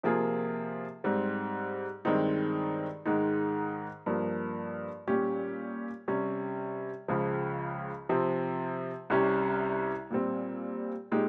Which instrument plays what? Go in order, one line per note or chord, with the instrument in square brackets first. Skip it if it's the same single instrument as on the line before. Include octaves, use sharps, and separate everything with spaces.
[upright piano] C3 F3 A#3 F4 G#4
G#2 G3 C4
G2 D#3 G#3 C4 D#4
G#2 D#3 G#3 D#4
G2 F3 A#3
A#2 G3 C#4 G4
C3 G3 C#4
C#2 C#3 F3
C3 F3 C4
C2 C3 G3 C#4 G4
A#2 G3 C4
A#2 G#3 D#4 G4